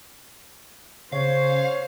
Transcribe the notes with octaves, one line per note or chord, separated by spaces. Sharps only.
C#3 C5 C#5 F5